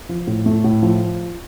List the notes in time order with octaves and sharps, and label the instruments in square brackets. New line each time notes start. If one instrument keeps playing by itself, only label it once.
[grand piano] F3
A2
A3
A2
F3